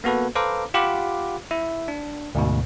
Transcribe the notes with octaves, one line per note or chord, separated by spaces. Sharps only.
A#3 B3 F#4 A4 B4
A4 B4 C5 F5 A#5 D6
F4 G4 F5 F#5 B5 D6
E4 E5
D4
D2 G#2 B2